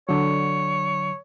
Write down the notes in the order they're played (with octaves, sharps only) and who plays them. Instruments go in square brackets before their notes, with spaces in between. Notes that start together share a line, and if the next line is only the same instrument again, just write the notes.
[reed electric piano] D3 F#3 [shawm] C#5